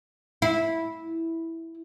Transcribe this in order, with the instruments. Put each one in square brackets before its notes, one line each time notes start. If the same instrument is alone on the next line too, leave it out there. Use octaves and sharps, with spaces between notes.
[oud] E4